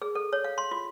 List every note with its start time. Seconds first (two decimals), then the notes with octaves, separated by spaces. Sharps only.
0.02 G#4
0.15 A4
0.33 C#5
0.44 F5
0.58 C6
0.71 F4